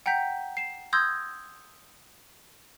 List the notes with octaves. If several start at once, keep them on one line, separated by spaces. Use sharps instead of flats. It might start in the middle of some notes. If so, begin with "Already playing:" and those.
F#5 G5 A#5 G6 B6
C7 E7
C6 D#6 E6 G6 G#6 A#6